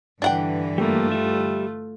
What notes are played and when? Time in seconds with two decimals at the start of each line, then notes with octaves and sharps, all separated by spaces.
0.22 G2 D3 E3 D4 F#5 G5
0.78 G3 A3 A#3 F4
1.12 G3 E5